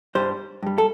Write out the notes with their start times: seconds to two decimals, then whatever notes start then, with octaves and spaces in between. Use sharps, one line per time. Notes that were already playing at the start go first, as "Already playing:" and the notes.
0.15 G2 G3 C5
0.63 G2 G3
0.78 A4